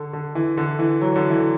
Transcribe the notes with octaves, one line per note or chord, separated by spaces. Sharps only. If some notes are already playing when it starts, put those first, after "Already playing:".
Already playing: D3
D3
E3
D3
E3
F#3
D3
E3